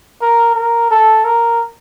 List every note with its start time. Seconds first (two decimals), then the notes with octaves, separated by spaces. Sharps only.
0.22 A#4
0.55 A#4
0.91 A4
1.25 A#4